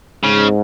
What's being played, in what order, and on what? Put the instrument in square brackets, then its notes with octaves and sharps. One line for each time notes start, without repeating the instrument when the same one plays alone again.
[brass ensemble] G#2 [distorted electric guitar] C#3